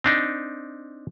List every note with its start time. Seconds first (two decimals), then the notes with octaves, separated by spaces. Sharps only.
0.04 C4 D4 D#4